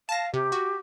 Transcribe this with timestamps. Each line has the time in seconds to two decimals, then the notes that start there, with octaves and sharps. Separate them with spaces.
0.09 F5 A5 A#6
0.34 C3 G4
0.52 F#4